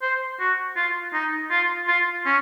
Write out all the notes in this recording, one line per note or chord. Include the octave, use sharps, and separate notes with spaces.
C5
F#4
F4
D#4
F4
F4
C#4